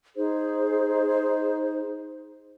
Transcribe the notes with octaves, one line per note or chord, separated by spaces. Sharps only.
D#4 G#4 C5